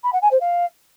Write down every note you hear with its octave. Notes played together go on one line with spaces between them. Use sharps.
B5
F#5
G#5
C5
F5